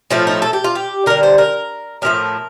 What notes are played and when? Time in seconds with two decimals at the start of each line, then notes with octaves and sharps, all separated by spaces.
0.10 A2 F3 A3 F4
0.27 D#4
0.42 A4
0.53 G4
0.64 F4
0.75 G4
1.06 D3 G3 A#4
1.23 C5
1.38 A#4
2.02 A2 F3 A3 A#4